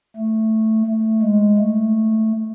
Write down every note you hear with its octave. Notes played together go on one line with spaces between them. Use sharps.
A3
A3
G#3
A3